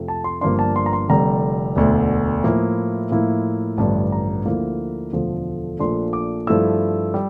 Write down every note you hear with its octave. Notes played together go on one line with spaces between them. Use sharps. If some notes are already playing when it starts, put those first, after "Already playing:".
Already playing: F2 C3 F3 A3
A5
C6
G1 G2 F3 A#3 D4 C6
A5
C6
A#5
C6
F1 F2 D3 G3 A#5
E1 D2 D3
A2 F3 A#3 E4
A2 F3 A#3 E4
A1 G2 D3 F3 A5
A#5
D2 D3 F3 A#3 E4
E1 D2 D3 F3 A3
A#1 A#2 F3 A3 D4 C6
D6
G2 F3 A3 E4 E6
G3